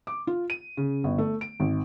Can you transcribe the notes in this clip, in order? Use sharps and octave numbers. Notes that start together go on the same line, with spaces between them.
D6
F4
D#7
C#3
G1
A3
D7
G#1